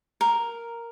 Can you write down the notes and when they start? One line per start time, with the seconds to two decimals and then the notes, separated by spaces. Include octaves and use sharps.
0.21 A#4